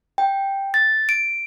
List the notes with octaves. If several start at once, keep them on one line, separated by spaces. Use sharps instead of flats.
G5
A6
D7